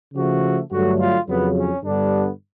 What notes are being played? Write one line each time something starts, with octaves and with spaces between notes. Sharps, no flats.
C#3 F3 A3 F#4
G2 D3 F#3 A3 F#4
F4
F2 C#3 F#3 B3
C#4
G2 D3 G3 B3 D4